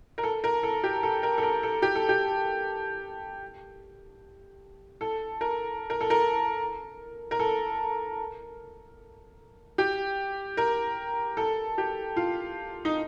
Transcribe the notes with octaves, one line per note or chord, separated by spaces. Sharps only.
A#4
A4
A#4
A4
G4
A4
A#4
A4
A#4
A4
G4
A4
G4
A4
A#4
A#4
A4
A#4
A#4
A4
G4
A#4
A4
G4
F4
D#4